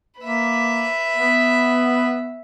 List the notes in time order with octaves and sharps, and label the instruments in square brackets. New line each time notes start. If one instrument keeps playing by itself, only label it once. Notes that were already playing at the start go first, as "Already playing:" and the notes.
[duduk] A#3 [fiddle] B4 E5
[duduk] B3